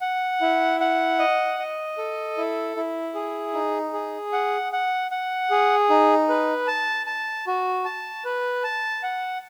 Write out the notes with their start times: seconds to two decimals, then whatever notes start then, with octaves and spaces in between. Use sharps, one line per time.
0.01 F#5
0.41 E4
0.80 F#5
1.19 D#5
1.59 D#5
1.98 A4
2.37 E4
2.77 E4
3.15 G#4
3.54 D#4
3.93 G#4
4.33 F#5
4.73 F#5
5.11 F#5
5.51 G#4
5.90 D#4
6.29 B4
6.67 A5
7.07 A5
7.47 F#4
7.85 A5
8.25 B4
8.64 A5
9.03 F#5